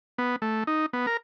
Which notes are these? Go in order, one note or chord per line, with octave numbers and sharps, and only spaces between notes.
B3
A3
D#4
B3
A#4